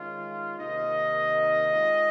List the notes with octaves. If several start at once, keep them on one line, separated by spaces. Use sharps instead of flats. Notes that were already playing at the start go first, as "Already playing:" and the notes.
Already playing: D#3 G#3 C#4 F4
C3 D#3 A#3 D#4 D#5
D#3 G#3 C4 F4